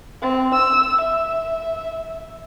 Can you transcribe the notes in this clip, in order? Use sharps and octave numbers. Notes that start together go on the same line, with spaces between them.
C4
E6
E5